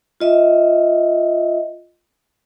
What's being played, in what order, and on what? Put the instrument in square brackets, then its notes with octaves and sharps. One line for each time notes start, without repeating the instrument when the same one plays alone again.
[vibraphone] F4 D#5 E5